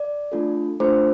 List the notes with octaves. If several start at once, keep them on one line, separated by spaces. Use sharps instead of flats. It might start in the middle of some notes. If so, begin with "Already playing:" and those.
Already playing: D5
A3 D4 F4 A4
A3 D4 F4 A4 C5